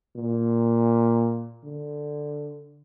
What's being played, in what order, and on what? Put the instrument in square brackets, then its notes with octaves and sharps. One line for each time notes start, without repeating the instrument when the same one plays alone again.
[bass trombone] A#2
D3